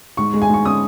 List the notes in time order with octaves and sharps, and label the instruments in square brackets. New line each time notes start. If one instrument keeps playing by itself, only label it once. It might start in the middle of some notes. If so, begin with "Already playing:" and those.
[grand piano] G#2 C#6
G#3
G#5
G#2 C#6
C#4 D#6